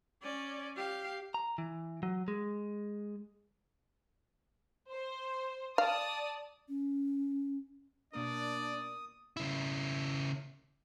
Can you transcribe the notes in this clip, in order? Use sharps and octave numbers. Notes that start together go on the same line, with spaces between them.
C#4 D5
G4 F5
A#5
E3
F#3
G#3
C5
D5 F5 A5 D#6
C#4
B2 A#3 D4 A#4 D5 D#6
C#3 E4